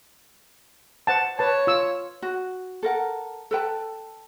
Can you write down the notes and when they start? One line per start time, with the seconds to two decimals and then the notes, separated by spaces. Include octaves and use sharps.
1.07 C5 F#5 A5
1.39 B4 C#5 A5
1.67 F4 E6
2.22 F#4
2.83 A4 A#4 F#5
3.51 A4 B4 G5 A5